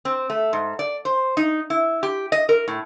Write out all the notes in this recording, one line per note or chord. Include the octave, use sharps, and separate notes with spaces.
C4
A3
G#2
D5
C5
D#4
E4
G4
D#5
A#4
A2